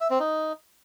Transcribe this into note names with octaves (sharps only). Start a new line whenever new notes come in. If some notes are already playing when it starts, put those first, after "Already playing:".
E5
C4
D#4